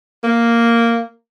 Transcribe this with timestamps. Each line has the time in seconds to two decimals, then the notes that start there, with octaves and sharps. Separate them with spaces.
0.24 A#3